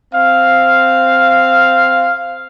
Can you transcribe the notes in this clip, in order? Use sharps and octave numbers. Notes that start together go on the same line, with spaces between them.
C4 F5